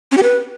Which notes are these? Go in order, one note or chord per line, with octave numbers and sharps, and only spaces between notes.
C#4
G4
B4